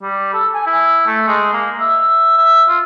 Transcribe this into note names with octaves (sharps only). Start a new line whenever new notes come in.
G3
A4
G#5
E4
A3
G#3
A#3
E5
E5
E5
F4